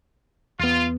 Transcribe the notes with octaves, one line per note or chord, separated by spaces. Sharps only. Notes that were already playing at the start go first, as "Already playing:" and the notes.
E2 B3 F4